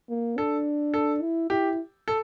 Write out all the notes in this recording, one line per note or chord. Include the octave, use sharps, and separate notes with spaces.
A#3
D4 A4
A4
E4
E4 G4
A4